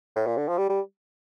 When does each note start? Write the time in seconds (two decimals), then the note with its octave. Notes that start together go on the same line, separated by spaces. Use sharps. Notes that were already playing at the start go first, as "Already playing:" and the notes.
0.16 A2
0.27 A#2
0.37 D3
0.49 F3
0.58 G3
0.70 G3